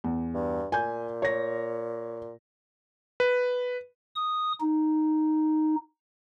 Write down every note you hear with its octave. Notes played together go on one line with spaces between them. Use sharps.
E2
G2
A#2 G#5 G6
C#5 A#6
B4
D#6
D#4